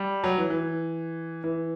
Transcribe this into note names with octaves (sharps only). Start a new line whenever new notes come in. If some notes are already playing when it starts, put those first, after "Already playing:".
Already playing: G3
F#3
E3
E3
E3